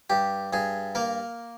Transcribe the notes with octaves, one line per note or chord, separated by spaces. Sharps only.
G2 G4
G2 G#4
A#3 A#4